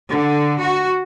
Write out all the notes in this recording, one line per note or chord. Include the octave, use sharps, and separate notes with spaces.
D3
F#4